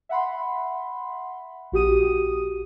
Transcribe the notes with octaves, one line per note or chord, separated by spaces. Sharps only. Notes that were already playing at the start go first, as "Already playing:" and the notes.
E5 F#5 B5 C6
A#1 F#4 G4 D#6 D#7